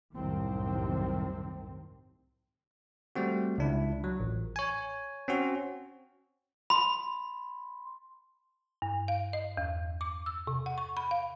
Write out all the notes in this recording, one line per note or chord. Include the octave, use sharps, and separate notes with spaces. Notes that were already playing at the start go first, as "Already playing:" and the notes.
C2 F#2 A2 C3 D#3 C4
G3 A3 C4 F#4
C#2 D4 E4
F#3
A1
C#5 G#5
C4 C#4 F#4
B5 C6
G2
F5
D#5
E2
D6
E6
C3
F#5
C#6
B5
F5